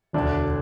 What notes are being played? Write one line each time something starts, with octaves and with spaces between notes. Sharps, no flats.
E1 D2 D3 D4